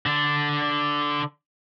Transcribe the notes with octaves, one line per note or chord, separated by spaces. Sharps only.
D3 D4